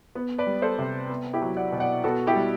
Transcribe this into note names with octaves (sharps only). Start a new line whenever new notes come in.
B3
B4 D5
G3
A4 C5
C3
B3
E4 G4
F#3
D5 F#5
B2
D5 F#5
B3 F#4 A4
E4 G4
G3